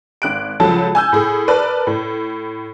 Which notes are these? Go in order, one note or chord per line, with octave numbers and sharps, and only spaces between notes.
G#1 F#6 D7
C#2 F3 F#3 A4 A5
G#5 E6 G6
A2 G#4
A#4 B4 D5 A5
A2